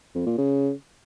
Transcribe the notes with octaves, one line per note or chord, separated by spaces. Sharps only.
F2
A#2
C#3